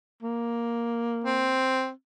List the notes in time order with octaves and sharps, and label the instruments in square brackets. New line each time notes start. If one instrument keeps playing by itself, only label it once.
[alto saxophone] A#3
[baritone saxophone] C4